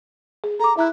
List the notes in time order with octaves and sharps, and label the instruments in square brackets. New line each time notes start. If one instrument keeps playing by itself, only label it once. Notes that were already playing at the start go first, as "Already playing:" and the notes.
[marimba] G#4
[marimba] A4 D6 [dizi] A#5
[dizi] E4 [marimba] E5 A#5 F#6